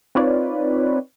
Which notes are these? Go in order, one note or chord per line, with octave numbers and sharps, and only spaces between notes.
C4 D#4 F4 B4 C#5 D5